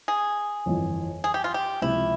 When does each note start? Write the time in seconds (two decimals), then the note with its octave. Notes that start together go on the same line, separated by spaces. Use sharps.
0.08 G#4
0.66 G1 F2 E3
1.24 G#4
1.34 G4
1.44 F4
1.54 G4
1.82 C#2 C3 F3 E4